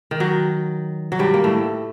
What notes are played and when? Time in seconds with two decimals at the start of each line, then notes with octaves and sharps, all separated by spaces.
0.11 D#3
0.20 F#3
1.12 F#3
1.19 G2 G3
1.34 A#3
1.44 A2 A3